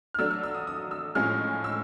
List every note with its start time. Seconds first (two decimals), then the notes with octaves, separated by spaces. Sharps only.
0.14 F6
0.19 F#3 A3 D4 E6
0.31 F6
0.43 E6
0.54 D#6
0.67 D#6
0.91 E6
1.15 A2 F3 G#3 C#4 F6
1.64 E6